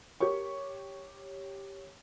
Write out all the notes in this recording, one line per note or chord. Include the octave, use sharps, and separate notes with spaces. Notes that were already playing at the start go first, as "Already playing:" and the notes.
G4 A#4 C#5 C#6